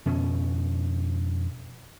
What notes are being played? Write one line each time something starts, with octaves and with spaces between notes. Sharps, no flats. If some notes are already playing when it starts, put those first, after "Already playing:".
F2 B2 C#4